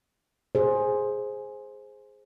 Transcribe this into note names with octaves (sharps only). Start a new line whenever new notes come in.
G#4 C5